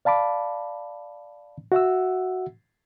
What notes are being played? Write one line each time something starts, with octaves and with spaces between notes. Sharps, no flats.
D5 F5 A5 B5 D6
F#4 E5 F#5 E6